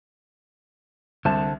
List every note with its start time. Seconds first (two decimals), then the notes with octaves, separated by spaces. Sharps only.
1.25 C2 D3 C5 A5